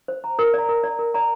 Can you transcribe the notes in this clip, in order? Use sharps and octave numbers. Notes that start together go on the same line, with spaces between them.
C5
A#5
A#4
D5 A#5
A#4
D5 A#5
A#4
D5 A#5